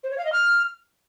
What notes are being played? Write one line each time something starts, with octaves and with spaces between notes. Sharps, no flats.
C5
C#5
F5
D#5
F6